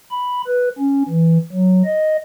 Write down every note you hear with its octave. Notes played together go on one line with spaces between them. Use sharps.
B5
B4
C#4
E3
F#3
D#5